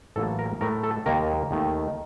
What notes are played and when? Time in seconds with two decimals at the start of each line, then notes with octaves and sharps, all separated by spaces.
0.16 A1 A2 F#3 A#3 A4
0.39 A#4
0.61 A2 A3 A#4
0.83 A4
1.06 D#2 D#3 A#3 A#4
1.51 D#2 D#3 A3